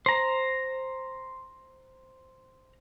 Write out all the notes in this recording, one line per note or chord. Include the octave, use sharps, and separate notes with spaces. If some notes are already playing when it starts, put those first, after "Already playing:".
C5 A#5